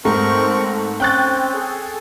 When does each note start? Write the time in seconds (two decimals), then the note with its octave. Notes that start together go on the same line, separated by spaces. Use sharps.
0.05 G#2 A3 C4 A#4 C#6
1.00 C4 C#4 G5 F#6 A6
1.54 G#4 A4